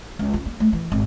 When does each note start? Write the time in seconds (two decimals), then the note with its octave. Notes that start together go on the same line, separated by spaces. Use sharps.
0.19 C#2
0.33 C#3
0.46 A#3
0.60 A3
0.73 E3
0.92 G#1